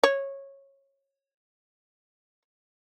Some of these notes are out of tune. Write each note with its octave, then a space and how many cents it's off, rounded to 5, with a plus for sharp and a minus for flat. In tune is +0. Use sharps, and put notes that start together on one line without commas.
C#5 -15